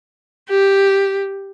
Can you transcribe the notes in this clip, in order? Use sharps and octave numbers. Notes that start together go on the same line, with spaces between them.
G4